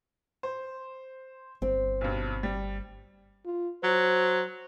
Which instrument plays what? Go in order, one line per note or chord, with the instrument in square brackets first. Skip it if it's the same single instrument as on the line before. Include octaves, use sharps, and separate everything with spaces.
[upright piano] C5
[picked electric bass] G1 [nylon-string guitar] C4
[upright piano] B1 G2
G3
[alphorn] F4
[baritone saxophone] F#3 [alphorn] C5